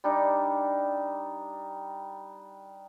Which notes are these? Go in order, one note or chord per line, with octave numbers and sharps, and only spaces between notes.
G3 D4 D#4